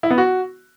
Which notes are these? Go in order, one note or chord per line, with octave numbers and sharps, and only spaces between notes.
E4
B3
F#4